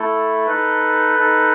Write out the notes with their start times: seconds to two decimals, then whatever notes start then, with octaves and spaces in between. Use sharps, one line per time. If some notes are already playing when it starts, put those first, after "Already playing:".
Already playing: A3 E4 A4
0.46 D#4 A4 B4
1.18 D#4 A4